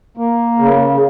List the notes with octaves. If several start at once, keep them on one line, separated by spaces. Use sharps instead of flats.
A#3
C#3